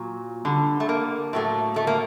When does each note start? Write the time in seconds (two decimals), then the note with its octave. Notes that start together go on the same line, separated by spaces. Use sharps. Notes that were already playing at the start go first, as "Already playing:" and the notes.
Already playing: A#2 F#3
0.45 D3 G3
0.80 A3
0.89 A#3
1.33 A2 F#3 A3
1.76 A3
1.87 A#3